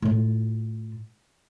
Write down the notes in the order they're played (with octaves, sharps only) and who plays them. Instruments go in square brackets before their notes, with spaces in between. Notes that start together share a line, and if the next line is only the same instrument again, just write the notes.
[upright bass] A2 F4